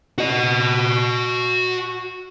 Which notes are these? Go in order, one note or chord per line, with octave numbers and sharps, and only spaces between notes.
F#4 D#5